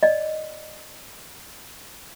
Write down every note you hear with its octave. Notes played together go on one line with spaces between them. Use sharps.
D5 D#5